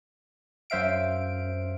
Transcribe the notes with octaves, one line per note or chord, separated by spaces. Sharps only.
F#2 C5 E5 F5 D7